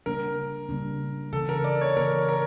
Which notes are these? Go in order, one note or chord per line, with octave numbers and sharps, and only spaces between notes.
C#3 G3 A#3 D4 A#4
C#3 G3 A#3 D4
C#3 E3 A#3 A4
A#4
D5
C#5
C#3 E3 A#3 A#4
A#4